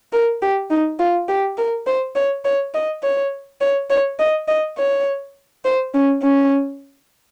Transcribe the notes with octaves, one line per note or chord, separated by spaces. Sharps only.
A#4
G4
D#4
F4
G4
A#4
C5
C#5
C#5
D#5
C#5
C#5
C#5
D#5
D#5
C#5
C5
C#4
C#4